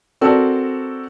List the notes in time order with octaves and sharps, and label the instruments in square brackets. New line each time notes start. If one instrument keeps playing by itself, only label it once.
[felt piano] C4 F#4 A4 A#4 D5